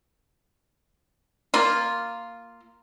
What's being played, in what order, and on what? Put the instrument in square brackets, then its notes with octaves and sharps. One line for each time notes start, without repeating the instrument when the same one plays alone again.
[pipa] A#3 F4